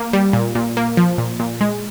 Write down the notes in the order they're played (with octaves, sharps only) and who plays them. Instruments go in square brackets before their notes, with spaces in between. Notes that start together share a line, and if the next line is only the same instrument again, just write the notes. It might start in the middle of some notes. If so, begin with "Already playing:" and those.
Already playing: [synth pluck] A#3
G3
A#2
A#2
A#3
F3
A#2
A#2
G#3